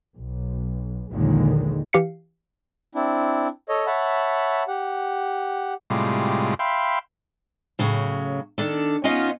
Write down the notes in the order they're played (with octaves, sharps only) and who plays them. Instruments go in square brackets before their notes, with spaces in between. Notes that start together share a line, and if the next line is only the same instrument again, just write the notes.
[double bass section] B1
A#1 D#2 A#2 D3 D#3 G#3
[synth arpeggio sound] E3 G4 F5 C7 C#7
[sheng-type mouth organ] C4 D4 E4
A4 C#5 D#5
C#5 E5 F#5 A5 B5
G4 F#5
[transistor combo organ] A2 C3 G3 G#3 F4
E5 F5 G5 B5 C6
[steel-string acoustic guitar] A2 C#3 F#3
D#3 D4 A4
B3 C#4 D#4 F4 D#5